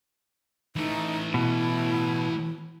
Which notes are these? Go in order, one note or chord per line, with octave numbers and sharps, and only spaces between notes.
E3 A3 D#4
B2 E4